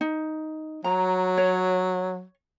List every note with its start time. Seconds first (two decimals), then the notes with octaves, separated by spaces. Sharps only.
0.01 D#4
0.84 F#3 A#5
1.37 C#5